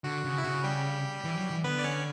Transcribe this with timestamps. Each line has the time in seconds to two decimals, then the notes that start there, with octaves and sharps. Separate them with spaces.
0.04 D3 F#4
0.24 C#3
0.38 E4
0.44 C#3 F#4
0.64 G3 G4
1.24 E3
1.37 F#3
1.51 E3
1.64 D3 B3 B4
1.79 D5
1.84 C#4 C#5